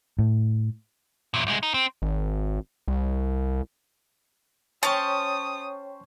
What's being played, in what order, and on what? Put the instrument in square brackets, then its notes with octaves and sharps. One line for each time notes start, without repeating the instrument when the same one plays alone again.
[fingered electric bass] A2
[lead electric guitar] E2 A#2
C2 G#3
D#4
C4
[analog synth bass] G#1
C2
[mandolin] C#4 C5 A5 [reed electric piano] C#5 G5 [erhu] D#6